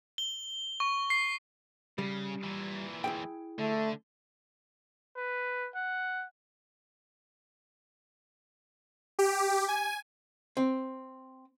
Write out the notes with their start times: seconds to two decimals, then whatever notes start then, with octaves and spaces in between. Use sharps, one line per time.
0.18 G7
0.80 C#6
1.10 C7
1.98 C#3 G3
2.43 A#2 E3
3.04 E4 G#4 G5
3.58 D3 A3
5.16 B4
5.75 F#5
9.19 G4
9.68 G#5
10.57 C4